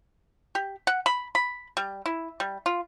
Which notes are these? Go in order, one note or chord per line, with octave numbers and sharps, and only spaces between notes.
G4
F#5
B5
B5
G3
E4
G3
F4